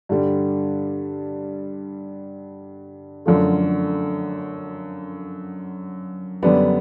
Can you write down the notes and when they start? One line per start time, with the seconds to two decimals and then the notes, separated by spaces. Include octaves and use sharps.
0.09 G2 D3 G3
3.26 F#2 D3 F3 A3
6.43 F#2 D3 G3 B3 D4